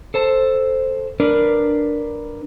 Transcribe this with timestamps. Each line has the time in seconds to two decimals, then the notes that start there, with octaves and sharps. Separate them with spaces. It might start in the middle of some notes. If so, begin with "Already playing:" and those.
0.14 A4 C5 A5
1.20 D4 A#4 B4 D5